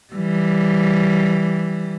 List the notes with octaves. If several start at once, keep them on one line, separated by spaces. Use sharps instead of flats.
E3 G3